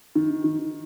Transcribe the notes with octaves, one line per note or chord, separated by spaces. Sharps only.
D#3
D#3